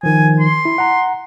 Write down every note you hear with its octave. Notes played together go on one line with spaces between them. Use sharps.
D#3 F3 G#5
C6
E4
F#5 A#5